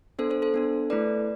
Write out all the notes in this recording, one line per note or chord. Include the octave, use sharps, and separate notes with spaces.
B3 D4 A4 C5
A4 C5
A4 C5
B3 D4 A4
A3 E4 A4 B4 D5